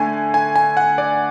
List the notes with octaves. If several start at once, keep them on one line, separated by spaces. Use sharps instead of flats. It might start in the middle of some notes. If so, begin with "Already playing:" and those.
Already playing: D3 A3 G#5
G#5
G#5
F#5
D5